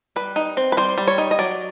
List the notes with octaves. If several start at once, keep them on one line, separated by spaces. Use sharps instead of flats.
G3 B4
D#4
C4
B4
G3 C5
G3
C#5
D#4
D#5
F#3 D5